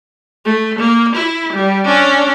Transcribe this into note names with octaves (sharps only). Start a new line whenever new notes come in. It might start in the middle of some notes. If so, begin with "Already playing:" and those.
A3
A#3
E4
G3
C#4 D4